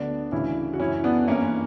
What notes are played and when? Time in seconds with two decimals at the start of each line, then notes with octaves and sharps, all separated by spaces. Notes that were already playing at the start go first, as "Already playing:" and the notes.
Already playing: D2 D3 B3 D4
0.32 D2 C#3 E3 C#4 E4
0.73 F#4
0.80 F#2 E3 C#4 E4
1.04 B3 D4
1.27 G2 E3 A#3 C#4